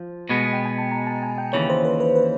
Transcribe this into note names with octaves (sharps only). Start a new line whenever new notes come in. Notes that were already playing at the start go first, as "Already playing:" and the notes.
Already playing: F3
B2 G#3 B3
G5
G#5
A5
A#5
A5
G#5
G5
D#2 C#3 E3 C#5
C5
B4
B4
B4